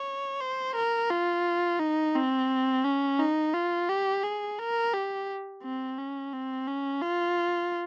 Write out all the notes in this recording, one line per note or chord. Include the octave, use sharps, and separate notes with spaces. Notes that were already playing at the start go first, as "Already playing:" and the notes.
Already playing: C#5
C5
A#4
F4
D#4
C4
C#4
D#4
F4
G4
G#4
A#4
G4
C4
C#4
C4
C#4
F4